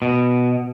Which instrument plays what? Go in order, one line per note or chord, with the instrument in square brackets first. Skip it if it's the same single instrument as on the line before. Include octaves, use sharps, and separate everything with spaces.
[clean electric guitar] B2